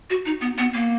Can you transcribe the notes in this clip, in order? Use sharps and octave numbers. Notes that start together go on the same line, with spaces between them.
F#4
D#4
B3
B3
A#3